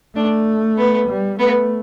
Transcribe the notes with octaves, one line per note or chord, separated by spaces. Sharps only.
A3 D4
B3
G3
A3 B3